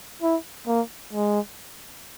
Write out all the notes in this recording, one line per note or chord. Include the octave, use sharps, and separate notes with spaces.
E4
A#3
G#3